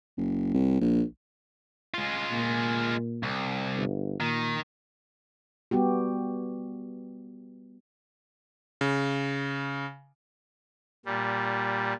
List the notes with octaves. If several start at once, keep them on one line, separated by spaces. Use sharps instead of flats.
F#1
C2
A#1
G#3 F4
A#2
C2
G1
A#2 D#3
G3 B3 F#4 G4
C#3
A#2 G3